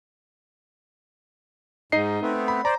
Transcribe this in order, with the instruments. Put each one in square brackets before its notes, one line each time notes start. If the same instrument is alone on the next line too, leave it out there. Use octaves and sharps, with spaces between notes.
[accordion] G#2 [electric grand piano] D#4 D#5 C7
[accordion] A3 B3 C4
[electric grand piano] B5
[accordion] C5 D5 [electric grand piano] A#5